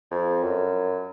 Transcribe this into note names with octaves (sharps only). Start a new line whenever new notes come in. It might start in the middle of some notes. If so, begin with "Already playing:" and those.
F2
F#2